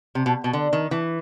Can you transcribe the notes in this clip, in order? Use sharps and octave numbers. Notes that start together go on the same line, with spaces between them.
C3
B2
B2
D3
D#3
E3